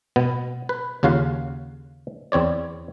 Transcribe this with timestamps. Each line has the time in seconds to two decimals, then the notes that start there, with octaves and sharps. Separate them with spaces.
0.16 B2 B3
0.69 B4
1.03 D#2 C#3 F4 F#4 F5 F#5
2.32 E2 C4 C#5 D5